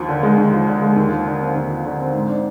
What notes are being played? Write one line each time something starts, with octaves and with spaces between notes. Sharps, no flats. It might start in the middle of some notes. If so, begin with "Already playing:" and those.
Already playing: D#2 F3
D3
G#3
D#2
F3
D3
G#3
D#2
F3
D3
C4
D#2
F3
D3
C4
G#2
D4